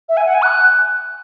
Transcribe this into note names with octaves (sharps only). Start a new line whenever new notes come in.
E5
G#5
F#5
G#5
F#6